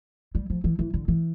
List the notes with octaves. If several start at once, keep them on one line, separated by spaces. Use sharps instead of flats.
G3
F3
E3
E3
D3
E3